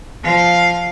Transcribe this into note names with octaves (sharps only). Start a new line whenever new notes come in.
F3 F5